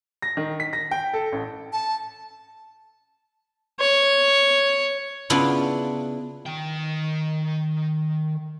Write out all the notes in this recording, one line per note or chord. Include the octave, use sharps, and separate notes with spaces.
A#6
D#3
B6
A#6
G5
A4
A1
A5
C#5
C#3 B3 D4 E4 F4
D#3 G5